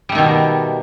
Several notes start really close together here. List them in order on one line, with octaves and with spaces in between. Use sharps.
G3 A3 D#3 B2